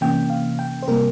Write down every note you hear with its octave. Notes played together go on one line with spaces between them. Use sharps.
C3 E3 A#3 C#4 G5
F5
G5
C5
C3 G3 A#3 A#4